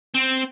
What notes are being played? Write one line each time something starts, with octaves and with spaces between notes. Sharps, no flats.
C4